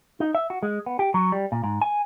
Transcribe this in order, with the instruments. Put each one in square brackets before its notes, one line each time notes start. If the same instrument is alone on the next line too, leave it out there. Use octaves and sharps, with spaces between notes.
[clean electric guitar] D#4
E5
F#4
G#3
B3
G4
F#3
G3
A#2
G#2
G#5